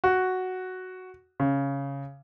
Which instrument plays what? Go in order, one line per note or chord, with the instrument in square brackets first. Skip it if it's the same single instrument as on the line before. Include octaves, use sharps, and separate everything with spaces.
[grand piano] F#4
C#3